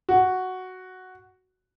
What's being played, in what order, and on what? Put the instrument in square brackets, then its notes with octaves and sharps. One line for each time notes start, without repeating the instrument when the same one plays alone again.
[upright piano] F#4